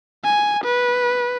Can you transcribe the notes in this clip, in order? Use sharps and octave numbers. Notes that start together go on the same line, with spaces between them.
G#5
B4